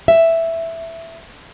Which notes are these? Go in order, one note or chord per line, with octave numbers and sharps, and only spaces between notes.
E5